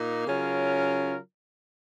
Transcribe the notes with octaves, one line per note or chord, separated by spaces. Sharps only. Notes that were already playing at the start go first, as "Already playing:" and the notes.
Already playing: A#2 A#3 D#4
C#3 F#3 C#4 F4 A#4